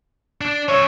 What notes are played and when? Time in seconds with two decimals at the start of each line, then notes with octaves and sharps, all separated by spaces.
0.41 D4
0.69 C#4 C#5 E5